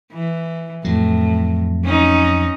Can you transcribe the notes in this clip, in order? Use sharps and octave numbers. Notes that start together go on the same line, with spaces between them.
E3
F2 A2 F#3
C#4 D#4